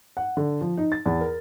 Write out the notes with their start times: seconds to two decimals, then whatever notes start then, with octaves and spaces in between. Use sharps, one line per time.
0.17 F#5
0.37 D3
0.61 F3
0.77 D#4
0.92 A6
1.06 E2
1.21 A#4